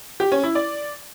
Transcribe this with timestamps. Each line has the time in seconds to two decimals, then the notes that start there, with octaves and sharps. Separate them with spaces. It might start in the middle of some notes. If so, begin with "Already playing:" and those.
0.20 G4
0.32 C#4
0.43 E4
0.55 D5